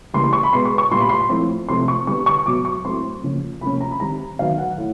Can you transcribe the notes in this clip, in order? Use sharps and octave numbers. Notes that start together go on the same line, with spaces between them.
C#3 E3 G3 A#3 C6
C6
C#6
B5
B2 G#3 B3 C6
C#6
C#6
A#2 G3 B3 C6
B5
C6
A2 F3 A3 C4
C3 F3 A3 C4 C6
C#6
D3 G3 B3 C#6
C#6
B2 F#3 B3 D6
C#6
A2 F#3 A3 C4 C6
C#3 F3 A#3 C#4
C3 F3 A#3 C#4 B5
A#5
B5
D#3 G3 C4 A#5
D#3 F#3 B3 F5
F#5
A2 A3